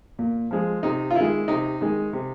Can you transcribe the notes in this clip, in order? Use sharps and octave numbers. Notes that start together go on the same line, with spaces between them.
A#2
F3 G#3
C3 D#4
F4
D#3 G#3 E4
C3 D#4
D#3 G#3
C3